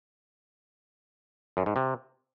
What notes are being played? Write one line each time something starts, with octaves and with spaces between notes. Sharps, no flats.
F#2
G#2
C3